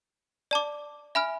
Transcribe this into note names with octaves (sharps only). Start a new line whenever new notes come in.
D5 A5 D6
E5 G#5 B5 F6